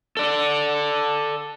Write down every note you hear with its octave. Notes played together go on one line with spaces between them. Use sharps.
A4 D5